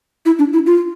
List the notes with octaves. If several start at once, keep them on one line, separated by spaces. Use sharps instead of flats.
E4
D4
E4
F4